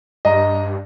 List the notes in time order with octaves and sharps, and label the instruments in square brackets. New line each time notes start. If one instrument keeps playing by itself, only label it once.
[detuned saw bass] G2 [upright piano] D#5 A#5